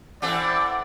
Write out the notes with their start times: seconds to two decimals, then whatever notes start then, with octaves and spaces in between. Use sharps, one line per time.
0.22 E3 C4 A4 D5 F#5